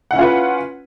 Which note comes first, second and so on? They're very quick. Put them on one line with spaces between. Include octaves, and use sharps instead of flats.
F#5 E4 C#4 F4 B4